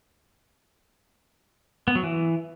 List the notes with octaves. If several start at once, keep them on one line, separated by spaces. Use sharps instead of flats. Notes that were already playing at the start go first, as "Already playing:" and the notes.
B3
F#3
E3